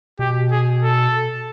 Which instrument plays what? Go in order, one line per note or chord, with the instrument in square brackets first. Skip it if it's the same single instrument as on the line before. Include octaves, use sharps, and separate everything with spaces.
[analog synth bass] B2 [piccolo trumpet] G4
[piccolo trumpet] G#4
A4